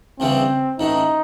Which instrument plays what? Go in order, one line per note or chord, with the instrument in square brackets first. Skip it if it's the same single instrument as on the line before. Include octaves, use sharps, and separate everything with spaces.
[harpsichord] D2 C#3 E3 G3 [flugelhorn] C4
[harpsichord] A1 A2 E3 [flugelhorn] D#4